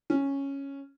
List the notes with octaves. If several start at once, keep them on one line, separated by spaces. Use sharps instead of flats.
C#4